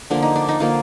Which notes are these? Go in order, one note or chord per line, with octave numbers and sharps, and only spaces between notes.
D3 F3 A#3 D4
D#4
D4
D#4
D3 F3 A#3 F4